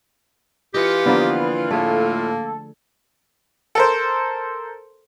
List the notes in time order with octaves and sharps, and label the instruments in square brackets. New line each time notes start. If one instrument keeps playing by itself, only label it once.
[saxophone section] E3 F4 [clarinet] G4 [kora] D#5 [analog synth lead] C#7
[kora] D3 F3 A#3 [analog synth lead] B3
[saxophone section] A2 F4 [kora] A3 G#4 [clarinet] A#3 [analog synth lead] A4
[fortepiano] A4 A#4 C5